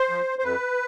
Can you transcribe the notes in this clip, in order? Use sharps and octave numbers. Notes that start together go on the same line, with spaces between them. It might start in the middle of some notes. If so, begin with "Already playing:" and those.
Already playing: C5
F3
C5
F2 B4